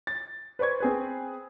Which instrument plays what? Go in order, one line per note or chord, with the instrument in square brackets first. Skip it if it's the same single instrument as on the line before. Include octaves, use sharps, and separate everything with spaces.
[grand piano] A6
B4 C5 D5 C#6 G#6
C4 G#4 B4